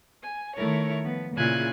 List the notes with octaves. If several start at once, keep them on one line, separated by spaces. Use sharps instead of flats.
G#5
D#3 A3 E4 A#4 C#5
F3 B3
A#2 C#3 E4 F4 G#5 F#6